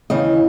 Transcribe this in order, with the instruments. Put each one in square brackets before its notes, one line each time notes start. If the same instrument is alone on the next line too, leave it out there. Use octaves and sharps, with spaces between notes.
[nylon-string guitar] D#2 C#3 E3 D#5